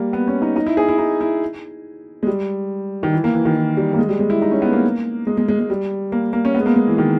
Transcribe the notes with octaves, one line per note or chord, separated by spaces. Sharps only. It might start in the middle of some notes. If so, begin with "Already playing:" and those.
Already playing: G3 A#3
B3
C#4
D#4
D#4
E4
G#4
E4
D#4
E4
G#3
G3
D#3
E3
A#3
E3
D#3
E3
G3
A#3
G#3
G3
G#3
E4
D#4
C#4
B3
A#3
G#3
G#3
G#3
G#3
G3
A#3
A#3
C#4
B3
G#3
A#3
G#3
E3
D#3